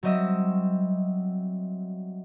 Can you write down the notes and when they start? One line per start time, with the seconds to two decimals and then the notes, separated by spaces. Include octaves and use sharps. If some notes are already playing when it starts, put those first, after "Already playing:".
0.03 F#3 G3 C4 D#5 E5